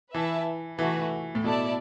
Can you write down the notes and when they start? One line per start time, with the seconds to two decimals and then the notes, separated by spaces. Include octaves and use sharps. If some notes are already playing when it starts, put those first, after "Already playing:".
0.14 E3 E4 B4 E5 A5
0.79 E3 A3 F#4 B4
1.35 A2
1.44 B2 E4 A4 D5 A5